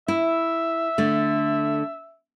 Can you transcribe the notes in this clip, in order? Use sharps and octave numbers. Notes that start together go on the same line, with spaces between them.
E4 E5
D3 A3